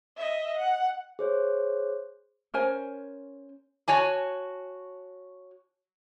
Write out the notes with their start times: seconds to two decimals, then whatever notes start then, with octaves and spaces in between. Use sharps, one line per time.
0.17 D#5 E5
0.57 F#5
1.19 G#4 C5 C#5
2.54 C#4 A#4 C5 G#5
3.88 F#4 C#5 G#5 A5